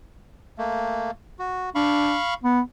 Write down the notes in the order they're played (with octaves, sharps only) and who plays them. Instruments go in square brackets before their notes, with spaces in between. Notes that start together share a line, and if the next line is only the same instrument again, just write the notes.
[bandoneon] A3 A#3
F#4
[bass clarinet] D4 [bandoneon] F5 B5 C#6
[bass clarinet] B3